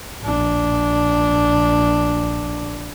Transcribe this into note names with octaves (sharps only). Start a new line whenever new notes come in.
A#1 D4